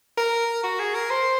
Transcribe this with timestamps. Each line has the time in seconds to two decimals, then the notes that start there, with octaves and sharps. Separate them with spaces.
0.18 A#4
0.63 F#4
0.80 G#4
0.94 A#4
1.10 C5